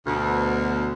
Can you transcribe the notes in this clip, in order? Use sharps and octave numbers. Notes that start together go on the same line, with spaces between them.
D2 B2